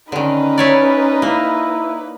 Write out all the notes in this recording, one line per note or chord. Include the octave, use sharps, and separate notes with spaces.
D3 D#3 C#4 D#4 B4
E4 C#5 D5
A#3 E4